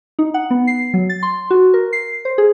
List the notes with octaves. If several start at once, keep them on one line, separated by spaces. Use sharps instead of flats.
D#4
F#5
B3
C7
F#3
A6
C6
F#4
A#4
C7
C5
G#4